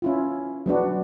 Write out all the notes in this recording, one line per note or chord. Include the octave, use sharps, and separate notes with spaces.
C#4 E4 F4
F#3 B3 D4 F#4